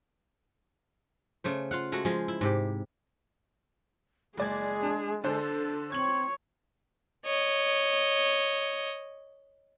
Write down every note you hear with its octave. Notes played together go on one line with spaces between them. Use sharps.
C#3 A3 C5
F4 F5 F#5
G#3 A3 F#4
F3 G#3 F4
E4
G#2 C3 G4
F#1 G#3 G#4 D5 G#6
D4
D3 D4 A4 C5
C4 C#5 G#6 F#7
C#5 D#5